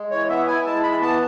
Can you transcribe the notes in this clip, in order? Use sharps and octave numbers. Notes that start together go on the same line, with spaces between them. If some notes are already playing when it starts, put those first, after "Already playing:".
Already playing: G#3
E3 C#5
B3 E5
E4 G#5
G#3 A5
E3 B5
B3 A5